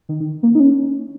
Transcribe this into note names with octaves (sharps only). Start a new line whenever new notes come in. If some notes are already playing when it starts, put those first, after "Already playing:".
D#3
D#3
A#3
D#4
C#4